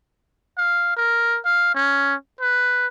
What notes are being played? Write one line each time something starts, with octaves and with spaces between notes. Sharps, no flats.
F5
A#4
F5
C#4
B4